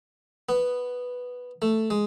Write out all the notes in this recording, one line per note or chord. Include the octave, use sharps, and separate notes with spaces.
B3
A3
G#3